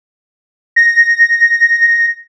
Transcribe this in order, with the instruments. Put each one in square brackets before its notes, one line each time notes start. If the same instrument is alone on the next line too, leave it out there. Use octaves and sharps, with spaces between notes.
[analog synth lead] A#6